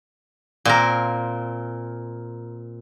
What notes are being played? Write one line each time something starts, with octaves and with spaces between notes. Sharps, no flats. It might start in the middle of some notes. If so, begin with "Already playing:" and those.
A#2 C4 A#4